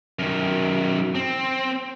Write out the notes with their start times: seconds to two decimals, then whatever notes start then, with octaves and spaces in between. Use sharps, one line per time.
0.19 F#2 D#3
1.15 C4